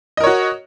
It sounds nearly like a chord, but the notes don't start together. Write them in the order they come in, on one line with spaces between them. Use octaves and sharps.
D#5 A#4 C#5 F#4